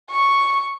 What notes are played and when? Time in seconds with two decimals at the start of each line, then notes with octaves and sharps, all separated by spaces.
0.10 C#6